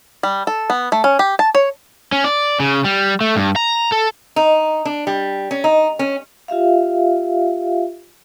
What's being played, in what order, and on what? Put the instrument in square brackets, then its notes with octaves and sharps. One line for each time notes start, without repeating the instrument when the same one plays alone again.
[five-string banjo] G3
A4
B3
A3
C#4
G4
A5
C#5
[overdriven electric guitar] C#4
D5
C#3
G3
A3
G2
A#5
A4
[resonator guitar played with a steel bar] D#4
D4
G3
C#4
D#4
C#4
[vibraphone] F4 G4 E5 F5